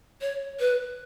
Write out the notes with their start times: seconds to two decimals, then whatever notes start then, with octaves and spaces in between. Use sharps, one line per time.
0.21 C#5
0.60 B4